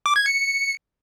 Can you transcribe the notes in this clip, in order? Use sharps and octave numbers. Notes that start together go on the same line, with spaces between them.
D6
G#6
C#7